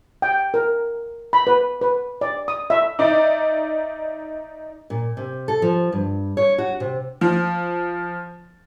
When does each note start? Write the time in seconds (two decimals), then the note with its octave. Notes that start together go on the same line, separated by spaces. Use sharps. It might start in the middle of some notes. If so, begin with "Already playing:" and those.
0.22 G5
0.54 A#4
1.33 B5
1.47 B4
1.81 B4
2.21 D5
2.48 D#6
2.70 E5
2.99 D#4 D5 E5
4.90 A#2
5.17 C3
5.48 A4
5.62 F3
5.92 G2
6.37 C#5
6.58 F#4
6.80 C3
7.21 F3